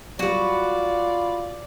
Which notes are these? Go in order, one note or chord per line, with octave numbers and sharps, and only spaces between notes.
F#3 G3 F4 F#4 B4 D5